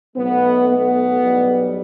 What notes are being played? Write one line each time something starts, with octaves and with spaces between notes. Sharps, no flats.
B1 B2 A3 B3
B3
B1 A2 G3